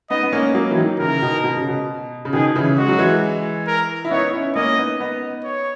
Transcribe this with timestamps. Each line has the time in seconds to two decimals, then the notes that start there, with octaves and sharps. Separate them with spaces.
0.10 B3 D#4 D#5
0.23 B3
0.32 A#3 C#4
0.55 F#3 A#3
0.71 E3
0.77 D#3 F#3
0.99 C#3 E3 A#4
1.22 B2 D#3
1.44 B2
1.57 C#3
1.68 B2
2.25 C#3
2.33 B2 D#3 G#4
2.56 C#3 E3
2.77 G#3 F#4
2.88 F#3
2.98 E3 G#3
3.67 A#4
4.05 E4
4.11 B3 D#4 C#5
4.33 C#4 E4
4.55 A#3 C#4 D#5
4.78 B3 D#4
5.00 B3 D#4
5.44 C#5